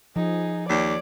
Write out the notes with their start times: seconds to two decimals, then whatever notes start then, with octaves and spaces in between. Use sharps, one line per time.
0.16 F3 D#4 G#4
0.69 D#2 C#5 D5